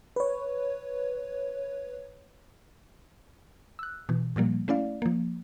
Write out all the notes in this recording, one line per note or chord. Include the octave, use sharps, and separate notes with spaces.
B4 C#5
E6 F#6
B2 E3
A#2 F3 G3 A#3
A3 C#4 E4 D5 F5
F3 A#3